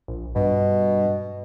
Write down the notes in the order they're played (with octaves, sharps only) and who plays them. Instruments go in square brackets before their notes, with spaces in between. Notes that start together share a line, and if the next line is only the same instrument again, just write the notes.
[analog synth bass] A#1
[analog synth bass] G2 [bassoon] B2